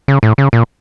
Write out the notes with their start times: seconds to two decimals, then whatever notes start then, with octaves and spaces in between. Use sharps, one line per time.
0.08 C#3
0.23 A2
0.38 C#3
0.53 A#2